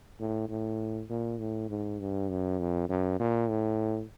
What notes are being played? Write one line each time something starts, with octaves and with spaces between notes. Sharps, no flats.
A2
A2
A#2
A2
G#2
G2
F#2
F2
F#2
A#2
A2